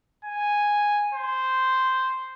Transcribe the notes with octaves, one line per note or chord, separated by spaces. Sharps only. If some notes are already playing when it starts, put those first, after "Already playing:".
G#5
C5